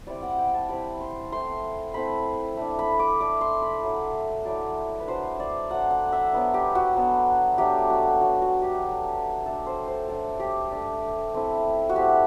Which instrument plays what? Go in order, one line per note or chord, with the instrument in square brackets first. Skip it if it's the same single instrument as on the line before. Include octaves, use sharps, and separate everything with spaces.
[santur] G3 C4 E4 D5
F#5
G5
A5
G3 C4 E4 B5
C6
A3 C4 E4 C6
A3 C4 E4 B5
A3 D4
B5
D6
A3 D4 D6
C6
B5
F#3 A3 E4
F#3 A3 E4 D5
B4
F#3 A3 D4 C5
D5
F#3 A3 D4 F#5
F#5
E5
F#3 B3 D4
G4
F#4
F#3 B3 D4
F#3 A3 D4 G4
F#4
F#3 A3 D4 F#4
F#4
G4
A3 D4
A3 D4 A4
C5
C5
A3 D4 A4
G4
A3 D4
A3 C4 E4
F#4
A3 C4 E4 G4